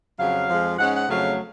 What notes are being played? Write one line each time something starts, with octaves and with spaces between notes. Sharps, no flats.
F2 C#3 F#3 F5
F2 F3 G#3
G#2 G#3 C#4 F#5
F#5
F2 C#3 F#3 A3 F5